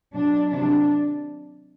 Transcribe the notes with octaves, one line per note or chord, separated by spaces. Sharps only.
B2 F#3 D4
C3 D#3 F#3 D4